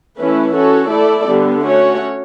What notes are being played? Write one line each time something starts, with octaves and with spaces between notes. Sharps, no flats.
E3 A3 C#4 E4 B4
C#4 F#4 A4 C#5
A3 E4 A4 D5
D3 G3 B3
A3 C#4 F#4 C#5